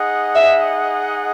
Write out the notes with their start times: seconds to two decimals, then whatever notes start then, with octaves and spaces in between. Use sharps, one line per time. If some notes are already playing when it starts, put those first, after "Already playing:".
Already playing: D#4 G#4 D#5 F#5
0.36 E5